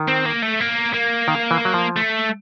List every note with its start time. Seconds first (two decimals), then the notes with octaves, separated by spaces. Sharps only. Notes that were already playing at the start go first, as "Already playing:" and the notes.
Already playing: D#3
0.08 C4
0.26 A#3
0.42 A3
0.60 A#3
0.93 A#3
1.28 D#3
1.51 E3
1.65 F#3
1.74 F3
1.96 A3